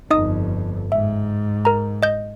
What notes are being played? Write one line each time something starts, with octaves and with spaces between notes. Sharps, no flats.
G1 F2 D#4 D#5 D#6
G#2 E5
A#4 A#5
D#5 G6